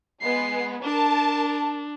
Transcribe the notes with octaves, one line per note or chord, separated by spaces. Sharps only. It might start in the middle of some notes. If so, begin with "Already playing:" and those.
G#3 B3 C7
D4 A#4 A5